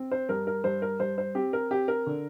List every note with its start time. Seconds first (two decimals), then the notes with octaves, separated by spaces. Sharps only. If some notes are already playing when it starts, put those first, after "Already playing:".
Already playing: C4
0.12 C5
0.29 G2 A#4
0.47 A#4
0.64 G2 C5
0.82 A#4
0.99 G2 C5
1.18 C5
1.35 C4 G4
1.53 A#4
1.71 C4 G4
1.88 A#4
2.06 D3